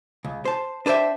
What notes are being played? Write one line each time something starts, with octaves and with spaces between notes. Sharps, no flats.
C#2
C5 A5
D4 B4 C5 E5 G5